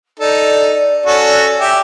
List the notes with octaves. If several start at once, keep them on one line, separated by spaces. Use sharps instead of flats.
D#4 A4 D5
C#4 F#4 A4
G4 E5